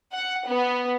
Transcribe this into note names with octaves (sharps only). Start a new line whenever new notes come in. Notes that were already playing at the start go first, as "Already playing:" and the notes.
F#5
B3